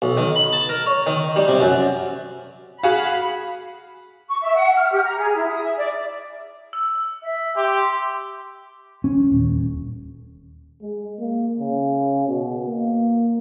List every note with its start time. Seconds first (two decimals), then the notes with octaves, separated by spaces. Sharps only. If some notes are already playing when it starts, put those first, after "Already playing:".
0.02 B1
0.17 D#3
0.36 B5
0.53 A5
0.69 A#4
0.86 C#5
1.06 D#3
1.36 G3
1.48 C3
1.61 F#2
2.83 F#4 G#4 F5 B5
4.29 C#6
4.42 E5
4.55 F#5
4.75 F6
4.91 G4
5.04 A#5
5.17 G#4
5.36 E4
5.49 D#6
5.62 E5
5.78 D5
6.73 E6
7.23 E5
7.56 G4 C6
9.04 C#4
9.32 D#1
10.81 G#3
11.19 A#3
11.60 C#3
12.28 B2
12.65 A#3